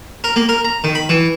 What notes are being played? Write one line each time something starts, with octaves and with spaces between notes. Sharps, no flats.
A#4
A#3
A#4
A#5
D#3
B5
E3